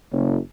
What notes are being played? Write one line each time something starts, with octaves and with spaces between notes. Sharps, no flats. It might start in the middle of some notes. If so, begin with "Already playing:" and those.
F#1